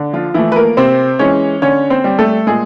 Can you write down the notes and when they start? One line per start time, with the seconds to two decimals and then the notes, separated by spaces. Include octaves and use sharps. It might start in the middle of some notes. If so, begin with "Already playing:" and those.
Already playing: D3
0.13 F3 F4
0.34 E3 F3 A3 E4
0.52 B4
0.56 A#3 A#4
0.77 C3 C4 C5
1.19 E3 G#3 C#4 C#5
1.62 D3 C#4 C#5
1.90 C4 C5
2.04 G3
2.19 A3 A4
2.47 A#2 G#3 G#4